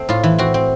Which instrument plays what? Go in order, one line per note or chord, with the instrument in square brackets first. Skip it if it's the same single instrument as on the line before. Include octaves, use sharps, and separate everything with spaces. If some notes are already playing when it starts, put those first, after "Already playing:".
Already playing: [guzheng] A3 C4
A2 F4
E3
C4 F#4
C4